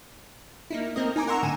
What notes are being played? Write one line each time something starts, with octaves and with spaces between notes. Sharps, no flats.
A#3 D#4 E4
A#3 C4 A#4 D#5
D#4 G#5 A#5 D6
A#4 F#5 A#5 C6 C#6 E6
A2 D3 G#5 D#7 E7